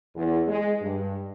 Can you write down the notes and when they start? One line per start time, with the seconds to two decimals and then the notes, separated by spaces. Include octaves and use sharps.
0.15 E2
0.48 G#3
0.80 G2